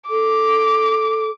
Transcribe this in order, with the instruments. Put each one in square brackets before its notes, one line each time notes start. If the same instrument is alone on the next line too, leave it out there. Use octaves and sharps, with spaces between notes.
[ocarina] A4 [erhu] D6